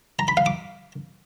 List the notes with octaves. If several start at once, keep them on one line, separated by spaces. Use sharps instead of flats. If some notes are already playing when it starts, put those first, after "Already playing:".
A#5
B5
F5
D6